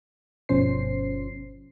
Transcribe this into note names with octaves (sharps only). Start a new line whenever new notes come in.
G1 B2 F3 C#4 C5 C7